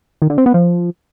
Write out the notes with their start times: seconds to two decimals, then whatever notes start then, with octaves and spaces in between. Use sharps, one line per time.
0.22 D#3
0.30 D3
0.38 C4
0.46 B3
0.54 F3